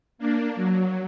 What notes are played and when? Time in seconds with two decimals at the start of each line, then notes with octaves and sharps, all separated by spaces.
0.18 A#3 D4
0.56 F#3